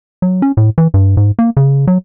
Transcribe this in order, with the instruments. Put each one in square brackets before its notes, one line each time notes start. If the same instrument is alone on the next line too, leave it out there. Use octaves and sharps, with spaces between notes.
[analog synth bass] F#3
C#4
A2
E3
G2
G#2
A#3
C#3
F#3